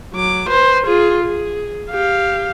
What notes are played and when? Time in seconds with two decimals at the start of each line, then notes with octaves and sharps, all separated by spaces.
0.14 F#3 D6
0.49 B4 C5
0.86 F4 G#4
1.24 G#4
1.91 G4 F5